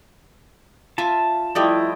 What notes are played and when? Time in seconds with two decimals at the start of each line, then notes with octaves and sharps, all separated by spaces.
0.98 F4 E5 G#5 A5
1.55 F3 G3 A3 E4 D5 D#5 G5